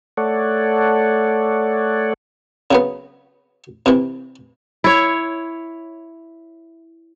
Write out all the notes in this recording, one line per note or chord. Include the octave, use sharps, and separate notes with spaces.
A3 A4 C#5 D5 F#5
C#3 F#3 B3
C3 E3
E4 C#5